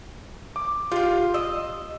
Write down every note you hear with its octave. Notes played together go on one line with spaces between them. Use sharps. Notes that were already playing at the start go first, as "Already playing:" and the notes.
D6
F4 G4 F5
D#5 E6